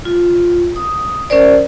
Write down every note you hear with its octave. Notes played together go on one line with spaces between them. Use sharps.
F4
D#6
C#4 A#4 C5 D5